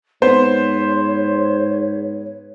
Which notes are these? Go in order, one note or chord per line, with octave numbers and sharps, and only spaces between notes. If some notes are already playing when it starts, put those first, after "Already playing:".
G#2 B3 C5 C#5